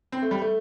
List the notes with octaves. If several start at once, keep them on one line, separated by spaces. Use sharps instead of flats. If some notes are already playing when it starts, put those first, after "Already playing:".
C4
A3
G3
A3